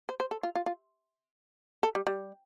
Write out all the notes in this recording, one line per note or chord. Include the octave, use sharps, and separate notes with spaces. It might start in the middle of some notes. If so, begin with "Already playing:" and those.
C5
C5
A4
F4
F4
F4
A4
G3
G3